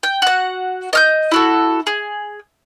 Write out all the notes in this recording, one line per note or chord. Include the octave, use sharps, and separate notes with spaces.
G5
F#4 F#5
D#5 F6 G6
E4 F#4 A4
G#4